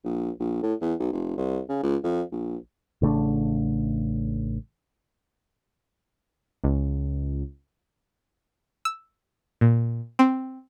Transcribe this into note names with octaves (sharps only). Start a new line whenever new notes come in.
A#1
A#1
A2
E2
B1
F1
C2
C#3
C#2
F2
A#1
A1 C#3 A3 D4
C#2
E6
A#2
C4